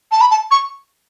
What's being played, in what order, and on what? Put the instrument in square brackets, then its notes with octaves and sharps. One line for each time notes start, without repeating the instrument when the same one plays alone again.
[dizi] A5
B5
A5
C#6